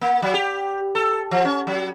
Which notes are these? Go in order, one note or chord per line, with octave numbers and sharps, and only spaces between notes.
A#3
F#3
G4
A4
F3
C#4
F#3